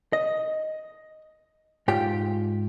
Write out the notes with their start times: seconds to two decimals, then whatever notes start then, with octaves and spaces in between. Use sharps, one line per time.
0.13 D#5
1.88 G#2 F4 G4 G5